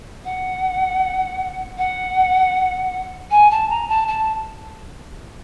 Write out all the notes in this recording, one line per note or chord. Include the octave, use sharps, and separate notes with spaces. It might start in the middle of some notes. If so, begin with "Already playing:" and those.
F#5
F#5
G#5
A5
A#5
A5
A5